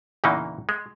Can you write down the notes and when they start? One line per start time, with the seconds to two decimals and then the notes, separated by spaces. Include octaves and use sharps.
0.24 E2 A#2 C#3 E3 A#3 D#4
0.69 G#3